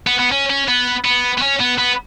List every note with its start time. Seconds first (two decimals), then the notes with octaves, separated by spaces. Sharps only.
0.07 B3
0.19 B3
0.32 C#4
0.50 C#4
0.68 B3
1.05 B3
1.38 B3
1.42 C#4
1.60 B3
1.78 B3